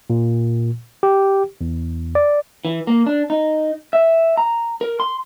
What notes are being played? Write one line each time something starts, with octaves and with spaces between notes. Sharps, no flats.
A#2
G4
E2
D5
E3
A#3
D4
D#4
E5
A#5
A#4
C6